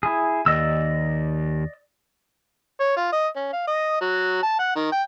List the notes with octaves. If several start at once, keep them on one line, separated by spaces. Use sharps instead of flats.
E4 G#4
D#2 D5 D#5 E6
C#5
F4
D#5
C#4
F5
D#5
F#3
A5
F#5
D#3
G5